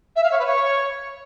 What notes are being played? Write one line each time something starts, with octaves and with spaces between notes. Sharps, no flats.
E5
F5
C#5
B4
C#5